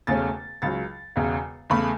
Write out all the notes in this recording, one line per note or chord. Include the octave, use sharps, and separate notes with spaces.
E1 E2 C#3 A3 C#4 A6
C#2 C#3 F#3 A6
E1 E2 C#3
E2 C#3 A3 B5